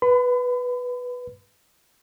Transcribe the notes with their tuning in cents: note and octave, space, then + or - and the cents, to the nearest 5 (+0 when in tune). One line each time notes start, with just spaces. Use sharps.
B4 +0 B5 +40